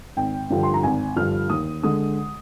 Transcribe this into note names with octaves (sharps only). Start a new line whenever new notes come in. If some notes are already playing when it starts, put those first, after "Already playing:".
G#1 G5
G2 D3 F3
C6
A#5
G#1 G#5
G2 D3 F3 F6
D#2 D#6
D3 G#3 D#6